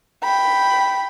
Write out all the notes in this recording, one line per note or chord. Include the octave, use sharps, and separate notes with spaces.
G5 B5